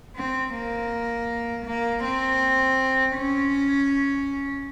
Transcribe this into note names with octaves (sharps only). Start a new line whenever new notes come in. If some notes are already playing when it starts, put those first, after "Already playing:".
C4
A#3
A#3
C4
C#4